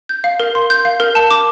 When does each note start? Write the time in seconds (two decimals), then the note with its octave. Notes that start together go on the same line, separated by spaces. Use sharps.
0.09 G6
0.24 F5
0.40 A#4
0.55 C6
0.70 G6
0.85 F5
1.00 A#4
1.15 A5
1.31 D6